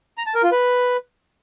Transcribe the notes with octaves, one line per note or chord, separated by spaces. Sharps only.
A#5
A5
A#4
F4
B4